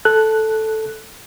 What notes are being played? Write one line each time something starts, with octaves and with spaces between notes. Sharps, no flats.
A4 F#6